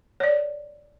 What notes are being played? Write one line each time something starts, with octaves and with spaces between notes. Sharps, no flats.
C#5 D5